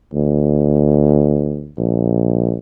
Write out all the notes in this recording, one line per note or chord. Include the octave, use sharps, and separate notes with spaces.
D2
A#1